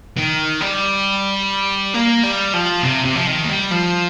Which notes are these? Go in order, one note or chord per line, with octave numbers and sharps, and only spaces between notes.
D#3
G3
A#3
G3
F3
C3
C3
F3
D#3
A#3
G3
F3